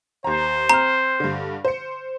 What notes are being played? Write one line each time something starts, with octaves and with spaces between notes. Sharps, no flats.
D#2 C5 A#5
C4 A#5 F6
G2 D3
C5 C#7